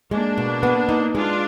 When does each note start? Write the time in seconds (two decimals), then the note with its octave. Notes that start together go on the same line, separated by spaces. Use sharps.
0.11 G#3 A#3 D4
0.38 B2
0.63 B3
0.89 D#4
1.15 G#3 D4 F4